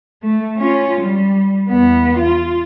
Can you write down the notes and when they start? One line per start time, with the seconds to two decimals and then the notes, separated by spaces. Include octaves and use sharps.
0.22 A3
0.58 C#4 F4
1.01 G3
1.69 E2 B3
2.18 F4